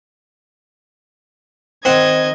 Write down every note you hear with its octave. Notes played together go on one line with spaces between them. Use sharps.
D#3 C4 D#5 F#5 G#6